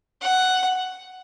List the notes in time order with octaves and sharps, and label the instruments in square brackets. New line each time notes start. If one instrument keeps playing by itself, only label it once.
[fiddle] F#5